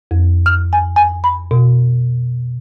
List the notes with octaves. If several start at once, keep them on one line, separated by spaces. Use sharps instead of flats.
F2
F6
G#5
G#5
B5
B2